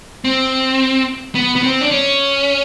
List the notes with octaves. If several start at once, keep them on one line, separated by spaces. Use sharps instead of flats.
C4
B3
B3
C4
D4
C#4